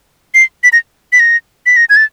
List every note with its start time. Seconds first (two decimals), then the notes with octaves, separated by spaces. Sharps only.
0.35 C7
0.64 B6
0.73 A#6
1.13 B6
1.20 A#6
1.66 B6
1.76 A#6
1.90 G#6
1.97 A6